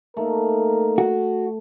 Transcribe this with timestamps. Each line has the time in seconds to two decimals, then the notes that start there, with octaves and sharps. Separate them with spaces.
0.17 A3 A#3 D#4 A#4
0.98 F#4